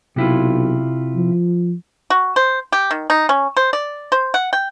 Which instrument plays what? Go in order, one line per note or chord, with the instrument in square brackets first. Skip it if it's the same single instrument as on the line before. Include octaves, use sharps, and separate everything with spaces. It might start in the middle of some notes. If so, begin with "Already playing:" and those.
[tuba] B1 [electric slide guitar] C3 E4 F4
[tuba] F3
[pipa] F#4
C5
G4
D#3
D#4
C#4
C5
D5
C5
F#5
G5